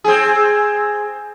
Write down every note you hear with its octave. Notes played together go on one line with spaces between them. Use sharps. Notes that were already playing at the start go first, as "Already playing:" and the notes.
C4 G#4